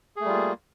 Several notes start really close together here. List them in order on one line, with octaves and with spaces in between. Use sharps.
G#4 A3 G3 F4 A#3